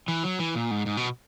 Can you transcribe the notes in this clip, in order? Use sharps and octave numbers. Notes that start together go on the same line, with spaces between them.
E3
F#3
E3
A#2
G#2
G#2
B2